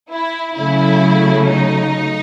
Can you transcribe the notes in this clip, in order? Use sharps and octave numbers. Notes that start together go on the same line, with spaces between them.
E4
C#3 F#3 A3 E4
D#4